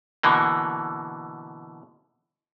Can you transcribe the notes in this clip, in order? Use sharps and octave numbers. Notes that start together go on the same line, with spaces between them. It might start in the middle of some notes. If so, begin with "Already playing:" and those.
B2 D3 E3 A#3